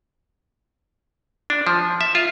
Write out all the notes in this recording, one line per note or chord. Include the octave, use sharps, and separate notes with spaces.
D4
F3
E5
F4